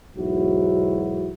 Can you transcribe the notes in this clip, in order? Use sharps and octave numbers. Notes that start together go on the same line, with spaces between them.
B1 E2 G#2 F#3 E4 F#4